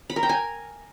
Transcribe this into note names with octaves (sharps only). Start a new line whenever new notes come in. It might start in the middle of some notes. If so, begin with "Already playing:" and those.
B5
A#4
G5
G#5